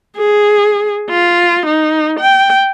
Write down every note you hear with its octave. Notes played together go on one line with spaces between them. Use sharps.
G#4
F4
D#4
G5